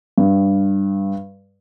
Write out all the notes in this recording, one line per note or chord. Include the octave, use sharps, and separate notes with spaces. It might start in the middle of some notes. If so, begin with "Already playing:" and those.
G2